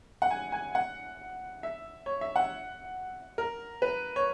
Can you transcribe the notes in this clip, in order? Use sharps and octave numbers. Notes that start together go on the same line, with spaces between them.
F#5
G#5
G#5
F#5
E5
C#5
E5
F#5
A#4
B4
C#5